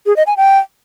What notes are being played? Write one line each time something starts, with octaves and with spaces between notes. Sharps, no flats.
G#4
D#5
G#5
G5